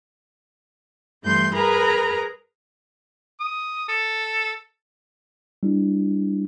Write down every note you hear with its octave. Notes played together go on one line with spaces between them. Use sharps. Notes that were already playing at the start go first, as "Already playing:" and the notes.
G2 E3 G3 A3 C6 G6
G#4 A#4 B4 A#5 B5
D#6
A4
G3 D4 E4